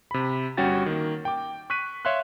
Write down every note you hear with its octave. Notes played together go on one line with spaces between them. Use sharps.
C3 B5
G1 G3 C#4 F#4 G5 A6
D#3 A#3
G5 D6
C#6 F#6 B6 D#7
C#5 E5 F5 C6 F#6